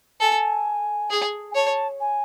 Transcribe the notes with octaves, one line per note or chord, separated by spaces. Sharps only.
A4 G#5
G#4
G#5
C#5 A5
G#5